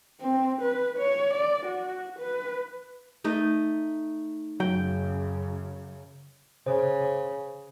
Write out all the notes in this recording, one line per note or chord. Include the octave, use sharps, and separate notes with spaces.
C4
B4
C#5
D5
F#4
B4
A3 D#4 D#5
F#2 C#3 F#3 G5
C#3 C5